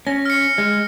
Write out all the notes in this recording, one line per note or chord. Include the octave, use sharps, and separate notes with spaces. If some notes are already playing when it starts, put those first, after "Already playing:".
C#4 A#6
F6 C#7
G#3